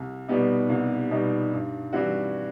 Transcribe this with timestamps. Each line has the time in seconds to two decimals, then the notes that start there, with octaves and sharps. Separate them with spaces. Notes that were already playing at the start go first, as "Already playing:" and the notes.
Already playing: C2
0.28 B2 G3 B3 D#4
0.69 C2
1.11 B2 G3 B3 D#4
1.53 G2
1.93 E3 G3 C4 F#4